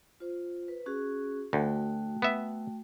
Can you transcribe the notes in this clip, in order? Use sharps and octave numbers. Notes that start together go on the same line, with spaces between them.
F4 C5
B4
C#4 F#4 G#4
D2 A3 F#4 G5
B3 E5